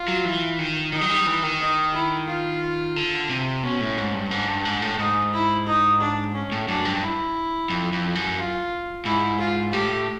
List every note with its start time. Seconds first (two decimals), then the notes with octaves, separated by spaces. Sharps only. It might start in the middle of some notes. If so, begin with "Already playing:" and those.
Already playing: F4
0.08 F#3
0.25 E3
0.59 D#3
0.93 D#3 D#4
1.01 F#3
1.10 G3
1.27 E3
1.43 D#3
1.60 D#4
1.94 E4
2.28 F4
2.96 D3
3.30 C3
3.63 B2 C#4
3.80 A2
3.97 G#2
4.14 G2
4.31 G#2 D4
4.48 G2
4.65 G#2
4.82 A2
4.99 G#2 D#4
5.33 E4
5.67 D#4
6.01 D4
6.34 C#4
6.52 A2
6.68 F#2 D4
6.85 G2
7.02 E4
7.70 F2
7.92 F2
8.15 F#2
8.38 F4
9.05 G#2 E4
9.39 F4
9.73 A2 G4